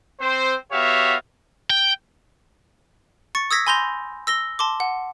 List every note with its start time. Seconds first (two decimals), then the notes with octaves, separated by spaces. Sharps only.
0.20 C4 C5
0.72 B3 F#4 G4 C#5 E5 F5
1.70 G5
3.35 C#6 A6 C#7
3.51 D#6 E6 G#6 A#6 B6
3.67 G#5 B5 C6 G6 A#6 F7
4.27 E6 A#6 G7
4.59 A5 C6 D6
4.80 F#5